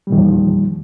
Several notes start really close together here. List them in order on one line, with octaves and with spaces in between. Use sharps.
G3 A#2 D#3 E2 F3